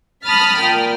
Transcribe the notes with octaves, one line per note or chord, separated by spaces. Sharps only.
A5 B5 D#6 F6 A6 B6
A#2 G5